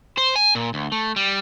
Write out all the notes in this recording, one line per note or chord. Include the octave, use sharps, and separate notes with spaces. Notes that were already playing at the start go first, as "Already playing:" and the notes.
C5
G#5
A#2
D2
A3
G3